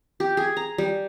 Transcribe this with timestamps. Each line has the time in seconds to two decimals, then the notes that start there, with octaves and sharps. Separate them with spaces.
0.20 G4
0.37 G#4
0.57 A#5
0.78 G3